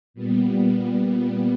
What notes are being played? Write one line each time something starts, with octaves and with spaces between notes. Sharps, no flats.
A#2 G3 B3